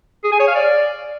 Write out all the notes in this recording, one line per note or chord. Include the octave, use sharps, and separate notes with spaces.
G#4
G#5
C#5
F5
D5